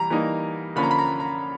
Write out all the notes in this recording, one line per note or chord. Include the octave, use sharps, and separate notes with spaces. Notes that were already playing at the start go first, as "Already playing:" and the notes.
Already playing: E3 G3 A#5
E3 G3 A#3 D#4
D3 F3 A#3 C#4 B5
A#5
B5
A#5
A#5